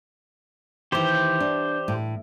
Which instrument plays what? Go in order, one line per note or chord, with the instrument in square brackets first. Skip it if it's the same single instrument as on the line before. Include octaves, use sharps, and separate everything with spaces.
[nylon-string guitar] D#3 E3 [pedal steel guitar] G4 C5
[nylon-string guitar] D4
A2